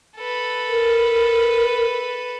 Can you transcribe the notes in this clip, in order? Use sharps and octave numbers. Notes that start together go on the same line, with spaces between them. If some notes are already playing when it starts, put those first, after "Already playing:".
A4 B4
A#4